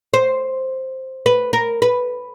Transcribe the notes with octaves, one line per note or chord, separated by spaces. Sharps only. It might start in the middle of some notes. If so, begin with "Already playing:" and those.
C5
B4
A#4
B4